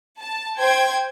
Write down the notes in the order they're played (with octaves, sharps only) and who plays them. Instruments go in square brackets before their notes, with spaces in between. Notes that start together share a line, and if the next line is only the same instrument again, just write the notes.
[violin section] A5
C5 G5 G#6